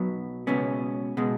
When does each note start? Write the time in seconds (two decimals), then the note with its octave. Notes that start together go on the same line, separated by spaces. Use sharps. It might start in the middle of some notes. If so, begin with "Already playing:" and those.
Already playing: B1 B2 F#3 B3
0.47 C#2 B2 B3 C#4
1.17 B2 G#3